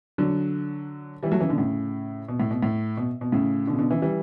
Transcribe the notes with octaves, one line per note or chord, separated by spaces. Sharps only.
D3 F#3
E3 G3
F#3 A3
C#3 E3
B2 D3
A2 C#3
B2
A2
B2
A2
B2
B2
A2 C#3
B2 D3
C#3
B2 D3
C#3 E3
E3 G3